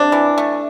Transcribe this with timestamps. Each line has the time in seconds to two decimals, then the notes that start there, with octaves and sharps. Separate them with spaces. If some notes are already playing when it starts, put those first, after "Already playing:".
Already playing: C3 D4
0.12 E3
0.38 A3